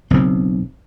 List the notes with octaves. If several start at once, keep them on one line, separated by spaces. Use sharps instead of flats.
F#1 B1 C#3 C4